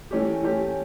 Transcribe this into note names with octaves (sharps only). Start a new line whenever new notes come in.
E3 A3 C#4 G4
E3 A3 C#4 G4